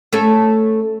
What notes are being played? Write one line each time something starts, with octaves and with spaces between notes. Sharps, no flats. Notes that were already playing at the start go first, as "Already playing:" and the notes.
A3 C#4 A4